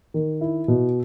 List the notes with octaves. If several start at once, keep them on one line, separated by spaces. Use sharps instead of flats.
D#3
E4
B2